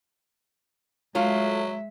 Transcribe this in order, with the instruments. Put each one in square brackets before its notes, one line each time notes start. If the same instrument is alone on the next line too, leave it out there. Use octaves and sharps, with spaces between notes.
[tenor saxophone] F#3 [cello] G#3 E5 [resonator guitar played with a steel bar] A3 F4